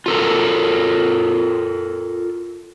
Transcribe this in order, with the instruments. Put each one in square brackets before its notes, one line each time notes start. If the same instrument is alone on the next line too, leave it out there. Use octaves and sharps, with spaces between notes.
[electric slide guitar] F4 A4 A#4